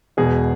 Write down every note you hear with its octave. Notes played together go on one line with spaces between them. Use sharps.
E1 E2 B2 G#4